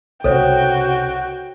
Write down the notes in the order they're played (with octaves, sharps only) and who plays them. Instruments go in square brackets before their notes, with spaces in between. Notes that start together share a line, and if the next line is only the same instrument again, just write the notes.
[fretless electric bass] C2 C#3 [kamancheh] F#4 G5 [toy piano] A4 C5 C#5